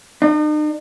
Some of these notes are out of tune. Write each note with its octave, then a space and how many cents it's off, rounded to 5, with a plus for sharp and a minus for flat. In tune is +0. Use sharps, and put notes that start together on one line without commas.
D#4 -45